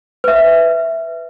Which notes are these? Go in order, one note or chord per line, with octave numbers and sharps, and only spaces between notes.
B4 E5